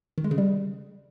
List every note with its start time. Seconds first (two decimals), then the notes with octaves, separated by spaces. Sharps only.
0.18 D#3
0.24 G#3
0.31 C#3
0.38 G3